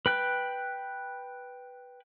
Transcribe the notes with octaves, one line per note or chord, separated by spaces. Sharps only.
B4 G5 F#6